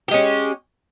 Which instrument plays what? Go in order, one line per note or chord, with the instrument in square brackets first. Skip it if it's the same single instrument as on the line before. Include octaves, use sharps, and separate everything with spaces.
[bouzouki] G4
G#3
C#4